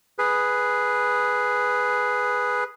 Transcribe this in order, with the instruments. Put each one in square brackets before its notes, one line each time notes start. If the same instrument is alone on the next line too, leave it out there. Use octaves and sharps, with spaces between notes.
[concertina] G#4 B4